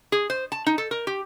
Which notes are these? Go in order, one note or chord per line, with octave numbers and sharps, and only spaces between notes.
G#4
C5
A5
D#4
A4
A#4
G4